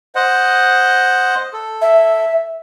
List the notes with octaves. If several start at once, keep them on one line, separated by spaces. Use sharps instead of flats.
C5 D#5 F#5
A4
E5